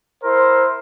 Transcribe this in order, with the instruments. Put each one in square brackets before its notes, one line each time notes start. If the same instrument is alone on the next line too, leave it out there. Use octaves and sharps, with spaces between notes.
[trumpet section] E4 A#4 C5